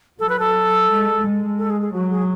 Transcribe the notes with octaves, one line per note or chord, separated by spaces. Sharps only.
F#3 A4
B4
A4
G#3
G#3
A4
G#4
G#4
F#3 F#4
G#4